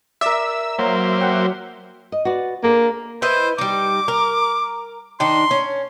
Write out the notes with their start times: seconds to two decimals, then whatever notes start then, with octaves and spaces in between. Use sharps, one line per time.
0.21 A#4 D5 E5 E6
0.79 F#3 A#3 C5
1.21 F#5 G5
2.12 D#5
2.25 F#4 B4 D5
2.63 A#3 D4 G#4 A4
3.22 E4 B4 C5 D#5
3.58 G3 D#4 D6
4.08 A#4
5.20 D#3 D4 D#4 C6
5.51 C#4